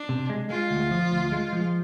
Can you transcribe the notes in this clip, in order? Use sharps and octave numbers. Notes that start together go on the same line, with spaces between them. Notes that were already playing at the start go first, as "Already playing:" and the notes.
Already playing: D4
C3
G#3
G#3 F4
D2
F3
D2
G#3
F3